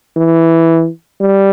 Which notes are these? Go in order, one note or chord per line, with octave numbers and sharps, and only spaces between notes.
E3
G3